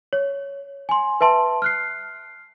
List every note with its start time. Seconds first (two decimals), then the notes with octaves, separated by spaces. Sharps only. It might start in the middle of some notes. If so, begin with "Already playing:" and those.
0.13 C#5
0.89 G#5 C6
1.21 B4 E5 A5 C6
1.62 F6 F#6 C7